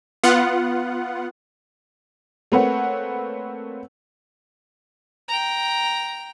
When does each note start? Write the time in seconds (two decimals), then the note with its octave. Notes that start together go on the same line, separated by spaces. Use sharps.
0.23 B3 F4 F#5
2.52 A3 A#3 C4 B4 C#5 F#5
5.28 G5 A#5